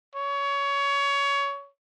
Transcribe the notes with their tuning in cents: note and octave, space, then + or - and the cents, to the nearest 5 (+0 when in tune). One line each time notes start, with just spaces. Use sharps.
C#5 +20